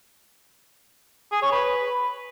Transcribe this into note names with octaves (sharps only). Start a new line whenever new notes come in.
G#4
C#5
B4